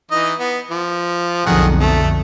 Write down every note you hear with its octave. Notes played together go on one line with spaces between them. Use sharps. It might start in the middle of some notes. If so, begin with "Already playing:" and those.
E3 D#4 D#5
B3
F3
B1 F2 D3 D#3 G#4 F#5
A3